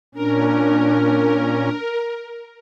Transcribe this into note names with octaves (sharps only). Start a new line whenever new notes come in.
A#2 C#4 D4 A#4